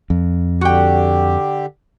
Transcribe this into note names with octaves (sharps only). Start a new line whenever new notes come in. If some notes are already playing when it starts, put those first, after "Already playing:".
F2
D3 F#4 G4 G5